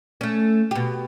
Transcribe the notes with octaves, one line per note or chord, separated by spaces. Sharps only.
A3 C#4
B2 G4